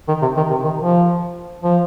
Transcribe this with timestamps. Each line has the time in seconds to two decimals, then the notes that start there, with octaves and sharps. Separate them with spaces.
0.08 D#3
0.22 C3
0.37 D#3
0.50 C3
0.64 D#3
0.79 F3
1.63 F3